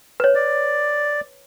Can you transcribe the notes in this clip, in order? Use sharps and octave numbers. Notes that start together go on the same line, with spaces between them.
B4 C#5
D5